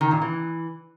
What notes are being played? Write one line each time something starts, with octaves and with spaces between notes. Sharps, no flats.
D#3
A#2
E3